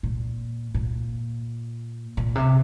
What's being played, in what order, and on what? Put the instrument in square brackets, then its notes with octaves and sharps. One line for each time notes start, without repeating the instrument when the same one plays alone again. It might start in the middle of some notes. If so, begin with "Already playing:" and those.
[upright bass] A#2
A#2
A#2
C3